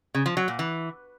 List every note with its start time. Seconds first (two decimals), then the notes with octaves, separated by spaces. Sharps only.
0.15 C#3
0.26 F3
0.37 F#3
0.48 A#2
0.59 E3